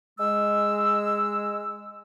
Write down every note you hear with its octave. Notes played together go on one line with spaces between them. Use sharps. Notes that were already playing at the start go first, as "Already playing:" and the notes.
G#3 E6